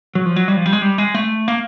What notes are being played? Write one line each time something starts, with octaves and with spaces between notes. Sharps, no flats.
F#3
F3
F#3
G3
F3
G3
G#3
G3
G#3
A3
A#3